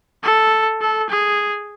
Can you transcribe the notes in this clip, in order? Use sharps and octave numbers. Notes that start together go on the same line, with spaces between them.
A4
A4
G#4